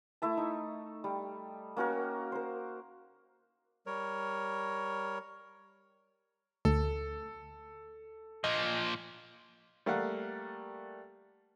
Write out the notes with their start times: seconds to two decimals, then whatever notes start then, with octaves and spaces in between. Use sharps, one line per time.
0.22 A3 E4 E5 A5
0.37 D#4
1.04 G3
1.77 A#3 C#4 F#4 A#4
2.32 A#4 C5
3.86 G3 A#4 C#5
6.65 D2 A4
8.44 A#2 F3 D#5
9.86 G3 A3 A#3 F5 F#5